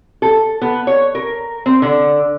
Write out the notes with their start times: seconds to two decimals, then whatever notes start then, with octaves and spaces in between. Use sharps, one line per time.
0.22 A4
0.62 B3
0.87 C#5
1.15 A#4
1.66 C4
1.82 D3